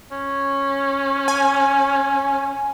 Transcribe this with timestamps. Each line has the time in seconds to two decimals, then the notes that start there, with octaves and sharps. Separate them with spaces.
0.11 C#4
1.28 G#5